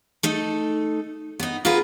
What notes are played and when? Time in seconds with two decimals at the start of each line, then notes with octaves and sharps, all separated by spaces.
0.23 A3 D#4 A4
1.40 B3 D#4
1.65 F4 F#4 G#4 A#4 B4